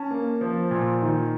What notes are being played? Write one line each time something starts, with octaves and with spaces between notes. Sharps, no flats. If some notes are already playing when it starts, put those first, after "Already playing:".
Already playing: C#4 A5
A#3
F3
A#2
D#3